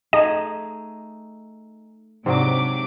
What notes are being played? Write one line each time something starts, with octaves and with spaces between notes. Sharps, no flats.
A3 D#4 G#4 D#5
G#2 C3 F#3 D4 D6